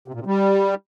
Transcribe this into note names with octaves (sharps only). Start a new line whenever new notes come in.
C3
A#2
C3
G3